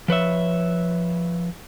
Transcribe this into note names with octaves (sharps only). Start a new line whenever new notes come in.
F3 B4 C#5 E5